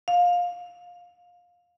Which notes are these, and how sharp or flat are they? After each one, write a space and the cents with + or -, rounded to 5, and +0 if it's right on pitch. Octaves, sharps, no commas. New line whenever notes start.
F5 +20